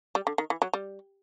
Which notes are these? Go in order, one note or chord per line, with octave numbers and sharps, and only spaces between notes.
G3
D3
D#3
E3
F#3
G3